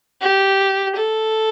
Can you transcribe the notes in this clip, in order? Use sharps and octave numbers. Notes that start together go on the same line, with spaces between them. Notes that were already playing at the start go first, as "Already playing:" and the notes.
G4
A4